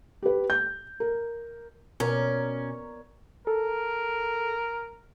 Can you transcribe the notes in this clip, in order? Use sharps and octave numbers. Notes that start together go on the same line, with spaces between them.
G4 B4
G6
A#4
B2 B3 C#4 A#4 C#5 D5 A#5
A4 A#4